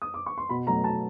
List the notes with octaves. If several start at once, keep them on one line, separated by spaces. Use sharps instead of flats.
D#6
D6
C#6
C6
B2 B5
F#3 A3 A#5
B2 A5